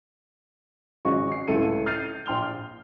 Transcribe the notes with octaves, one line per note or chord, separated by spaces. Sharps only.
G#1 C#3 F#4 G#4 D#5 C#6
C7
C#2 A2 E4 A4 C#7 D#7
F6 G6 A6 C7 D#7
A#1 G5 C6 F6 F7 G7
F6